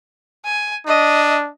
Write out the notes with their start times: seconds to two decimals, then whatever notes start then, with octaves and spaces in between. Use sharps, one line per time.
0.45 G#5
0.87 D4 D#5